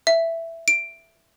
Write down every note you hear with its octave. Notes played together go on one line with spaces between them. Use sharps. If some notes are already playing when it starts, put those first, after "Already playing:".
E5
D7